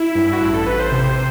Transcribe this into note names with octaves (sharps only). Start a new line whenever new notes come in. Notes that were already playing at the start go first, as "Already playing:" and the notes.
Already playing: E4
G2
F#4
A1 E4
A4
A1 B4
C5
C3